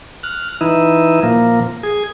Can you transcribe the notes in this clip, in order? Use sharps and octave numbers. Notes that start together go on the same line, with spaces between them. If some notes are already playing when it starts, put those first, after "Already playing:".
F6 F#6
E3 D#4 E4
A#2 F3 A#3
G#4